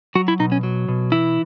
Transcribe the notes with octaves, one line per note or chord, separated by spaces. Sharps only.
F#3 F#4
E4
B2 D#4
C#4
F#3
B2
E3 E4